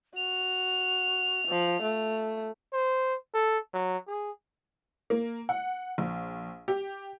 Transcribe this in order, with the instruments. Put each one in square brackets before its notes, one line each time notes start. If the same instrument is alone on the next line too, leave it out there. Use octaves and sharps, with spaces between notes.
[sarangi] F#4 [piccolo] F7
[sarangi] F3
A3
[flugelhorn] C5
A4
F#3
G#4
[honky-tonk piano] A#3
F#5
A#1
G4